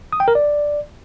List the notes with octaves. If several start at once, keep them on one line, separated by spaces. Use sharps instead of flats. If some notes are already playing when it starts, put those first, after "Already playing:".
D#6
G5
A#4
D5